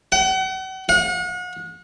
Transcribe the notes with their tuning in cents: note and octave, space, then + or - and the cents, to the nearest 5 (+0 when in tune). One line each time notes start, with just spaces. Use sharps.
F#5 +40
F#5 -40